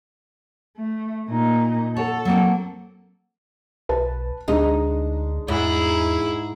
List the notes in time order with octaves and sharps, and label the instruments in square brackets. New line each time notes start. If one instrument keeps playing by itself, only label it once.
[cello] A3
A#2 D#4
[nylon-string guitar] F#4 C#5 [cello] A4
[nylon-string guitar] F#3 A#3 C4
[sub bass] B1 [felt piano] B4 A5
[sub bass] D2 [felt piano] G#3 D4 D#5 [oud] D#4
[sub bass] E2 [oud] G#2 [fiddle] E4 G#4